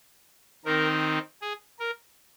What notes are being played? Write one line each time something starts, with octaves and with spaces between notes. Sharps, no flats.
D#3 C4 D#4 A#4
G#4
A#4